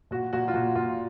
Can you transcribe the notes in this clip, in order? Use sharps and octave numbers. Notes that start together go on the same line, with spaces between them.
A#2 F#4
A#2 F#4
F4
A#2 F#4
A#2 F4